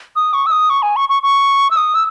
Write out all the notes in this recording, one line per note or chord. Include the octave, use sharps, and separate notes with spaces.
D#6
C#6
E6
D#6
C#6
G#5
C#6
C#6
C#6
E6
D#6
E6